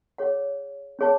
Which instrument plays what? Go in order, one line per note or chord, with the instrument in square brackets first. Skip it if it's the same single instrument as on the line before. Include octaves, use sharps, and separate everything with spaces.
[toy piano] G#4 C#5 F#5
C#4 G#4 C#5 F#5 A5